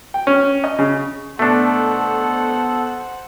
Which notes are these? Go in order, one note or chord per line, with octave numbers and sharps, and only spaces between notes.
G5
C#4
D#5
C#3
B2 A3 D4 A4 C5 F#5